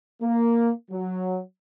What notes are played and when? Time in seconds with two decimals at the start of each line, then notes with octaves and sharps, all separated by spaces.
0.22 A#3
0.91 F#3